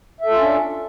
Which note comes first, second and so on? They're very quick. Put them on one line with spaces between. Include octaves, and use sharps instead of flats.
E5 A4 F4 C#4 D4